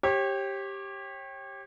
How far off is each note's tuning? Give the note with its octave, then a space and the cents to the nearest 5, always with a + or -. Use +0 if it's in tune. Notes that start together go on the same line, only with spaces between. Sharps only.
G4 +0 C#5 -35